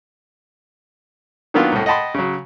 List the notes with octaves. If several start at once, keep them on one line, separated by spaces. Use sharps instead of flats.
D#3 F#3 A#3 B3 D4 F4
C2 A2
D#5 F#5 G5 A5 B5 C6
C#3 F#3